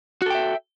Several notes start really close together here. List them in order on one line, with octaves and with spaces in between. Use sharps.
F#4 A4 G5 E5